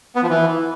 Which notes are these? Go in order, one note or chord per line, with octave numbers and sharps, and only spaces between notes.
B3
F3
E3